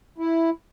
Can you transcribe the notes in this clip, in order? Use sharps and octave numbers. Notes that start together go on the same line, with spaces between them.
E4